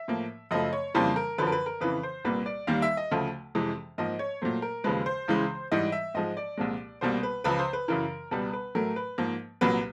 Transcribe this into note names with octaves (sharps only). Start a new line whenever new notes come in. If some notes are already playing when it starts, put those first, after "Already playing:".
Already playing: E5
A2 F3 A#3
F#2 C#3 F3 A3 D#5
C#5
F2 C#3 E3 G3 A#3 C5
A#4
F#2 D3 F3 B4
A#4
B4
A#4
F2 C#3 E3 B4
C5
C2 A#2 G3 A#3 B4
D5
D#2 D#3 G3 A#3 F5
E5
D#5
D2 C#3 F3 A3
F2 C3 E3 G#3
G#2 F3 A#3 D#5
C#5
A#2 F#3 A3 C5
A#4
D#2 C#3 F3 G#3 B4
C5
C#2 C#3 E3 G#3
G#2 E3 G3 D#5
E5
G#2 F3 G#3 D#5
D5
C2 A#2 F3 G#3
C2 B2 G3 A#3 C5
B4
C#2 C#3 F3 B4
C5
B4
F#2 C#3 E3 A#4
C#2 B2 G3 B4
B4
A2 F#3 A3 A#4
B4
G#2 F3 A#3
C2 A#2 F#3 A#3 B4